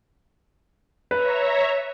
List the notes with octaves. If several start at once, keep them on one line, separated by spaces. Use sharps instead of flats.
B4 C#5 E5 A#5